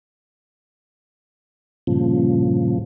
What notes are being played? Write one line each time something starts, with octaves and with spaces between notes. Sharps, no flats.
G2 A#2 C#3 F3